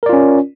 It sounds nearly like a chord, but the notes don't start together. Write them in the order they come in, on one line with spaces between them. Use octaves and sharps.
A#4 D5 F4 C#4